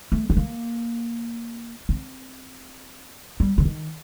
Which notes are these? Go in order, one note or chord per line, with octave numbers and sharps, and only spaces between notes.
A3
C4
A#3
C4
G3
D3
D#3